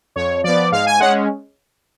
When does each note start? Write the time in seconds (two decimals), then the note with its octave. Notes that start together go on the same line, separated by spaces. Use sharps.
0.16 F2 C#5
0.44 F3 B3 D5
0.72 G#2 F5
0.86 G#5
1.00 G#3 C#4 F#5